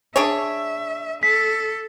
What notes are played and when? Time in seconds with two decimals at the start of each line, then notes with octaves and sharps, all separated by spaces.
0.16 D4 G#4 C#5 E5
1.23 A4 B6